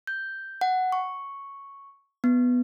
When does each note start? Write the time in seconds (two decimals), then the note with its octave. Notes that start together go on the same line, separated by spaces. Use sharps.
0.07 G6
0.61 F#5
0.92 C#6
2.24 B3